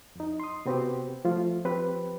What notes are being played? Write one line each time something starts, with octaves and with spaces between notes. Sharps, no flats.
F2 D#4
C6 D#6
C3 B3 C4 F#4 G4
F3 A3 F4
F3 C4 G4 B4